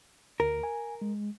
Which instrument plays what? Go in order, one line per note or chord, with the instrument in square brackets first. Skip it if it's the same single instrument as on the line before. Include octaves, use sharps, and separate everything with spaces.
[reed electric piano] D2 [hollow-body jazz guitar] A#4
[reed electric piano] G#5
G#3